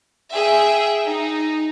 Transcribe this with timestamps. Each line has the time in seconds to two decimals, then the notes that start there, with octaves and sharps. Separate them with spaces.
0.33 G#4 E5 G5
1.05 D#4